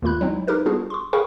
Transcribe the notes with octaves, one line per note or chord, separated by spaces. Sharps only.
D#2 D#3 A3 F4 B5 F#6
F#3 G#3 C4 D#4 E4
D#4 G4 A#4 B4
G3 B3 D4 F4 F#4 G#4
C6 C#6
G#4 A#4 F5 G5 B5 C#6